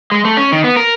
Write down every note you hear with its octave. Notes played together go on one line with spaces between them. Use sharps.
G#3
A3
C#4
D#3
B3
A#4